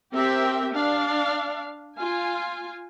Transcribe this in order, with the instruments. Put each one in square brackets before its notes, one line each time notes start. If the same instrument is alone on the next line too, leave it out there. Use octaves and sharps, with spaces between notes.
[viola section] C4 G4 A#4 E5 G5
D4 F5
F4 G#5